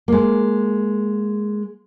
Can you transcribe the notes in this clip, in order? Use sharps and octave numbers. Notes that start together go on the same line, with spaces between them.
G#3 A#3